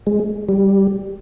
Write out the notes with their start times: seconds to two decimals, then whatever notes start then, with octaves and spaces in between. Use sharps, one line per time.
0.07 G#3
0.49 G3